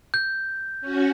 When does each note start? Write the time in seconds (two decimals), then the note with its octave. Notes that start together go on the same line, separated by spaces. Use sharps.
0.14 G6
0.81 C#4 F#4